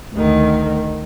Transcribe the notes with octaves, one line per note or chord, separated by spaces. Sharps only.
D2 D#3